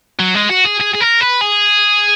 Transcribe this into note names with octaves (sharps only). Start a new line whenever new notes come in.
F#3
G#3
F#4
G#4
G#4
G#4
A#4
B4
G#4